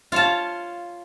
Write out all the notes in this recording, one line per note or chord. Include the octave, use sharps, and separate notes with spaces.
F4 C#5 A5